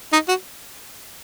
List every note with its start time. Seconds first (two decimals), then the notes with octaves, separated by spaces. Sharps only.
0.13 D#4
0.29 F#4